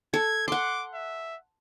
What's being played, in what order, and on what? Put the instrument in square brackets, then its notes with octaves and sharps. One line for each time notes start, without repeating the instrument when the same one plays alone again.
[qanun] A4 [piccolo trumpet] G#6
[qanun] F#5 C6 [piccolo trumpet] D6
[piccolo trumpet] E5